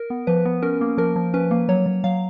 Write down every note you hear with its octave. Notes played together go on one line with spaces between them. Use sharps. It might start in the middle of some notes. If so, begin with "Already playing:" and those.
Already playing: A#4
B3
F3 B4
B3
C#4 A#4
A#3
F3 A#4
F3
C#4 B4
A#3
F#3 C#5
F#3
F#3 F5